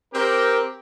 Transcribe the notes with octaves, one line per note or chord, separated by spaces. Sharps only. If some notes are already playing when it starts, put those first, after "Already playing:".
C4 G4 A#4